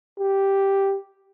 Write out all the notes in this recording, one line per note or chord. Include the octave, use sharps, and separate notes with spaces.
G4